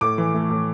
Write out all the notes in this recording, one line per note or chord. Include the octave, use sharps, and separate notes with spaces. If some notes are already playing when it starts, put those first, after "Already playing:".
A2 D6
E3
A3
A2